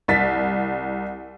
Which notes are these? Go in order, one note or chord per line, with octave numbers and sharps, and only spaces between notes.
C2 A6 B6